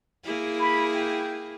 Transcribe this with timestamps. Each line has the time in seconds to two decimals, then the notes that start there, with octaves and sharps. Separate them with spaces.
0.23 A#3 E4 G#4
0.59 B5
0.93 G5